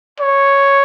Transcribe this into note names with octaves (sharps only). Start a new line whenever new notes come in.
C#5